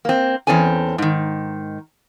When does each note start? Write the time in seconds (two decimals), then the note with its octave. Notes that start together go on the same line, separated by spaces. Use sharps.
0.05 A#3 C4
0.47 E2 C4 C#4 A4 G#5
0.98 G#2 D#3